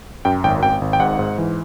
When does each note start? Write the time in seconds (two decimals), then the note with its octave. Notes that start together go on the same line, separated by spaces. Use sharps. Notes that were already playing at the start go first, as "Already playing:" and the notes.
0.25 F#2 G5
0.44 G#1 G5
0.62 G#1 G5
0.81 G#1
0.93 G5
1.00 G#2 F#5
1.19 G#2
1.38 E3